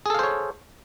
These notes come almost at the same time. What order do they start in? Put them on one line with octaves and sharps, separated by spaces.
G#4 A4 F5 C5 C#5